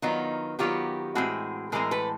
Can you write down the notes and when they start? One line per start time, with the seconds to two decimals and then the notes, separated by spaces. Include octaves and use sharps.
0.02 D#3 F#3 B3 D#4 F4
0.59 D#3 F#3 B3 F4 G4
1.15 A2 E3 G#3 C4 F#4 G#4
1.72 A2 E3 G#3 C4 G#4 A#4
1.91 A4 B4